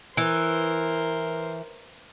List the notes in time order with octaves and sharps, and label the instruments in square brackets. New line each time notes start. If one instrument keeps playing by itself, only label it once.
[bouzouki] E3 [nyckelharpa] A#4 C5